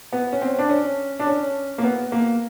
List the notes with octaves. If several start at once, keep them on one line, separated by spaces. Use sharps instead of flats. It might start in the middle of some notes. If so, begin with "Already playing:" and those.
B3
C#4
C4
D4
C#4
D4
C#4
A#3
B3
A#3